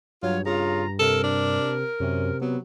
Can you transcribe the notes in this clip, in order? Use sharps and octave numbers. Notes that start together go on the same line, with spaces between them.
G2 F#3 F4 C#5
C#3 F4 A#5
C3 A4 A#4
D4
F#2 C3 C#4
F#3 B3